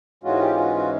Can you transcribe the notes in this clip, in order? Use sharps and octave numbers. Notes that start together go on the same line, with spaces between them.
G#2 E3 G#3 C#4 F4 F#4
G4
F#4
F#4